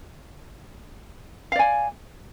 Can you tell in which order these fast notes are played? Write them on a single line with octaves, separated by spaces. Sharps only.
F5 D5 G#5